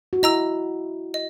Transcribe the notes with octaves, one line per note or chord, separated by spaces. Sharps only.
F#4
E4 D#5 A#5 E6
D#5